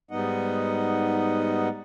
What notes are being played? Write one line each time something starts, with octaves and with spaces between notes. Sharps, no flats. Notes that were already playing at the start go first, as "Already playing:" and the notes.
G#2 G3 B3 D#4 D#5 F#5